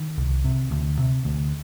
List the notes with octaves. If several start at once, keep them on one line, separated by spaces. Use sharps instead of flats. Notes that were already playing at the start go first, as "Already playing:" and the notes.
Already playing: D#3
C2
C3
D2
C3
D2